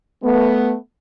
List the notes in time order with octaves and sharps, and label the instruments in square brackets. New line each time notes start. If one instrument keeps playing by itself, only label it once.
[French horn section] A3 B3